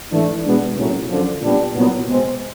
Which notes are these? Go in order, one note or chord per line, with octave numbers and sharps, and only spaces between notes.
G#2 E3 A3 D4
B2 G#3 B3 D4
C2 A#2 F#3 A3 C#4
F#2 D3 F3
A#2 G3 B3 D4
C2 A#2 F#3 B3
B2 G#3 C4